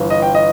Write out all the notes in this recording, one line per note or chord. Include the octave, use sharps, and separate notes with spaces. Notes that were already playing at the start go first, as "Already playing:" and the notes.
Already playing: G1 G2 E3
D#5
G5
D#5